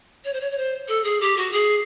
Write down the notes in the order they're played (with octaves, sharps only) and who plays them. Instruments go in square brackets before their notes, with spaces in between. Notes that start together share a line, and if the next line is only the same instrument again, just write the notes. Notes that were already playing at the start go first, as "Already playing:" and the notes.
[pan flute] C#5
C5
C#5
C#5
C5
A4
G#4
G4
F#4
G#4